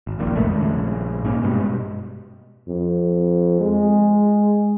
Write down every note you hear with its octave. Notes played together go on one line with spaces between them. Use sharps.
G#1
F1 A#1 A#2 D#3
F2 D#3 G#3 A3
A#1 C#3
G#2 A#3 C#4
G2 B2 G3 G#3
F2
G#3